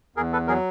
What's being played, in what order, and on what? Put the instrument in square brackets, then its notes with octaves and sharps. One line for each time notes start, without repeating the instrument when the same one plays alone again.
[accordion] E2 [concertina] G#4 A#4
[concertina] A4 B4
[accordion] F#3 [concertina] G#4 A#4